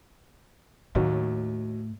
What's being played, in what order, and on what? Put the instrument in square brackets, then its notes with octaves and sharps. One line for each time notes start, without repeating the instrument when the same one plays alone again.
[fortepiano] D#2 F#3 [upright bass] A2